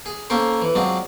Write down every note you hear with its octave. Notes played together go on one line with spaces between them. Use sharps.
G#4
A#3 C#4 A4 A#4 C5
E3
F#3 G#3 C4 D4 F4